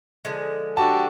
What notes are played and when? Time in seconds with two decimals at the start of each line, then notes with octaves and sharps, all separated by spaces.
0.25 D3 F3 G#3
0.77 D4 F#4 G4 A4 A5